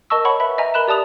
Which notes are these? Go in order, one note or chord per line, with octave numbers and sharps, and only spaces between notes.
A#4 D#5 A5 C#6 E6
C#5 F#5 B5 C#6
B4 E5 B5
D#5 E5 G#5 A#5
A#4 B5 F#6 E7
G4 D5 A5 D#6 F7